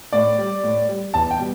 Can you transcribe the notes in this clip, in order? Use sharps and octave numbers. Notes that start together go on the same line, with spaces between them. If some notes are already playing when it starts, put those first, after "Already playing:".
A2 D5
G3
A2
G3
E2 A5
G5
B2 G3